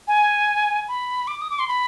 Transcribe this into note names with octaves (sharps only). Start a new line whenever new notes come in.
G#5
B5
D6
D#6
D6
C6
B5